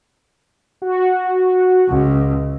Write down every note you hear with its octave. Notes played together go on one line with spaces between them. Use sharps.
F#4
C#2